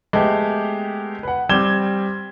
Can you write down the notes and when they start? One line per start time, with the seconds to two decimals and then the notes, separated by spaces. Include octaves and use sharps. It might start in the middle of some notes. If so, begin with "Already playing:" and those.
0.13 G#3 A3 B3 G4
1.23 B4 F#5
1.49 G3 C4 G#6 E7 G7